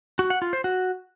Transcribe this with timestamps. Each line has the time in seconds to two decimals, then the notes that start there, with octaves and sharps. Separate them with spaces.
0.19 F#4
0.30 F#5
0.42 F4
0.53 C5
0.64 F#4